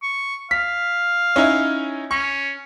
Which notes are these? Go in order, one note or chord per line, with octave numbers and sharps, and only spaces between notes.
C#6
F5 B6
C#4 D#4 E4
C#4 C#6